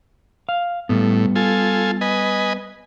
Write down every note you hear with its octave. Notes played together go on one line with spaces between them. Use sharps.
F5
A2 G3 B3
F4 A4 G#5
B4 D#5 G#5